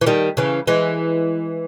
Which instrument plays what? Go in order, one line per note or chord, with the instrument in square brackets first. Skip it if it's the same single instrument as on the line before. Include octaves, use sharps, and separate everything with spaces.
[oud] E3
D#3 G3
C#3 E3
E3 G#3